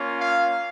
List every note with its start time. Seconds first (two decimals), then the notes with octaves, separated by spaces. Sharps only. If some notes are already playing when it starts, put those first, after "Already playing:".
Already playing: A#3 C#4 F4
0.21 F5